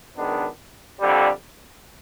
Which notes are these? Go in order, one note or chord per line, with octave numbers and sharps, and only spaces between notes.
F#2 D#3 G#3 B3 D4
F2 D3 G3